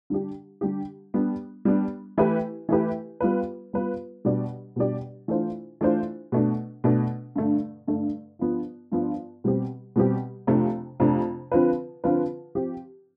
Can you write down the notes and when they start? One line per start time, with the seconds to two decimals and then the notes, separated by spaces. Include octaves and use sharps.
0.10 D3 G3 D4 G4
0.61 D3 G3 D4 G4
1.14 G3 B3 D4
1.65 G3 B3 D4
2.17 E3 A3 E4 G4 B4
2.69 E3 A3 E4 G4 B4
3.20 G3 B3 F4 B4
3.73 G3 B3 F4 B4
4.25 B2 G3 D4 G4 D5
4.76 B2 G3 D4 G4 D5
5.28 E3 A3 D4 F4 C5
5.81 E3 A3 D4 F4 C5
6.32 B2 A3 D4
6.84 B2 A3 D4
7.36 G2 D3 A3
7.87 G2 D3 A3
8.39 G2 F3 B3 F4
8.92 G2 F3 B3 F4
9.44 B2 G3 C4 G4
9.96 B2 G3 C4 G4
10.47 F2 C3 F3 A3 D4
11.00 F2 C3 F3 A3 D4
11.51 D3 F3 C4 F4 B4
12.04 D3 F3 C4 F4 B4
12.55 F3 C4 G4